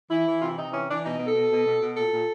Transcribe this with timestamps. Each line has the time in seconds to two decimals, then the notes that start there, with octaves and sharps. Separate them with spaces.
0.10 E3 E4
0.27 E3
0.40 C3 F4
0.48 E4
0.57 C3 D#4
0.73 E3 C#4
0.89 E3 D4
1.04 B2 D#4
1.19 B2
1.27 A4
1.35 B2
1.51 B2
1.66 B2
1.81 B2
1.96 A#2 A4
2.13 A#2